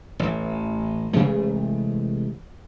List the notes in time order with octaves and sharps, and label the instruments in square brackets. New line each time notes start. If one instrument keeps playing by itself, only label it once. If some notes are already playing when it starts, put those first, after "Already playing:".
[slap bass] A1 E3
C3 E3 G#3 A3